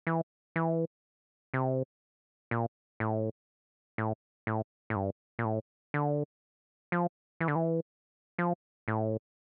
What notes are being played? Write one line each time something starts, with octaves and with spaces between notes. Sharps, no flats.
E3
E3
C3
A#2
A2
A2
A2
A2
G2
A#2
A2
D3
F3
E3
D3
E3
F3
A2